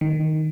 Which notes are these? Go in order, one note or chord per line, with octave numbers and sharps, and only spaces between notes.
D#3